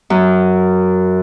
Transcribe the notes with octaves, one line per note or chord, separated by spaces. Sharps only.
F#2